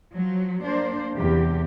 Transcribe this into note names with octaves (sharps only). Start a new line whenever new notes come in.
F3 F#3
A#3 D4 C5
E2 C3 G4